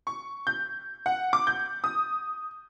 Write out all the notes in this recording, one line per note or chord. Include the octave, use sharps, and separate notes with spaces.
C#6
G6
F#5
D6
G6
D#6